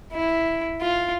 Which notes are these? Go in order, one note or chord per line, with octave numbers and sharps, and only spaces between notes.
E4
F4